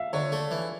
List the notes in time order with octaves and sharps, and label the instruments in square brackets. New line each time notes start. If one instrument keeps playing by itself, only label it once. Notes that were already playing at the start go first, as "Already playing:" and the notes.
Already playing: [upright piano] E5 F5
[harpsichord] D3 [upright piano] C#5
[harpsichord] A3
E3